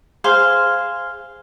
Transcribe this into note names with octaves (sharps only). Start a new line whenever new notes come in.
G#4 C5 F5 C6